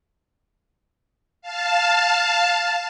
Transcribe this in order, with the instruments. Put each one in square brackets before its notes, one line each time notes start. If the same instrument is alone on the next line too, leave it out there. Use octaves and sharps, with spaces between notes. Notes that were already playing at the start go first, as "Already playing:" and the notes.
[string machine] F5 A5